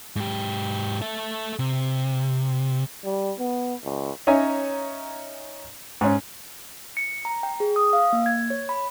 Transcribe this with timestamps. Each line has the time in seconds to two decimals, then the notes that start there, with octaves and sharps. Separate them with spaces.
0.16 G#2 G4
1.02 A4 E5
1.59 C3
3.05 G3
3.39 B3
3.84 C#2
4.27 C#4 D#4 C#5 E5 G#5 A#5
6.01 G#2 C#4
6.97 C#7
7.25 A#5
7.43 G5
7.60 G#4
7.76 D#6
7.93 F5
8.13 A#3
8.26 G#6
8.50 C#5
8.69 B5